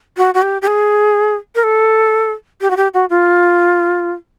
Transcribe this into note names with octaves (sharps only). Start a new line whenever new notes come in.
F#4
F#4
G4
G4
G#4
A#4
A4
G4
F#4
G4
F#4
F4